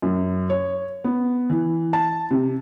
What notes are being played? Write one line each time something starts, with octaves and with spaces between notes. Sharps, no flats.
F#2
C#5
B3
E3
A5
C3